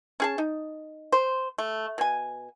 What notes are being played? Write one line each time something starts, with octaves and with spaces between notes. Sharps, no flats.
C#4 G#4 A5
D#4
C5
A3
B2 G#5